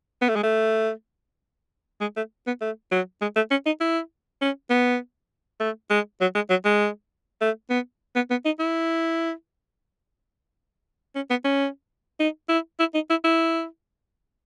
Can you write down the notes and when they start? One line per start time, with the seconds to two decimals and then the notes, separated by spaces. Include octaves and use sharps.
0.22 B3
0.29 A3
0.36 G#3
0.43 A3
2.01 G#3
2.17 A3
2.47 B3
2.61 A3
2.91 F#3
3.22 G#3
3.36 A3
3.51 C#4
3.66 D#4
3.81 E4
4.41 C#4
4.70 B3
5.60 A3
5.90 G#3
6.21 F#3
6.35 G#3
6.50 F#3
6.65 G#3
7.41 A3
7.70 B3
8.16 B3
8.30 B3
8.45 D#4
8.60 E4
11.15 C#4
11.30 B3
11.45 C#4
12.20 D#4
12.49 E4
12.80 E4
12.94 D#4
13.10 E4
13.25 E4